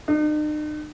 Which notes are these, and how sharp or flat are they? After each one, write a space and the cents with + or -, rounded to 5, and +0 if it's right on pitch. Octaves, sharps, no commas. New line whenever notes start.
D#4 -45